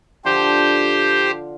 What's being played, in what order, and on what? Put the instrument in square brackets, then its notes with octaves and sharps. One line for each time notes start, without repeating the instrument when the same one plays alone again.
[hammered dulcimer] D3 F3 D4 F4 [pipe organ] G4 C5